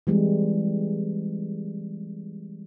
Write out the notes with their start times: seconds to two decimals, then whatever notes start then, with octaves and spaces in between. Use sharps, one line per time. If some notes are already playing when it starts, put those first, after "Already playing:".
0.07 E3 G3 G#3 C4